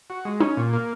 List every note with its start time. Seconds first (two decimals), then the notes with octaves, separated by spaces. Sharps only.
0.10 F#4
0.25 G#3
0.40 C#4 D#4
0.57 A#2
0.73 A#3